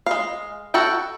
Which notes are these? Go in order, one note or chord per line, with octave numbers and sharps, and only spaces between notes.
G#3 F5
F#4 A4 F#5 G5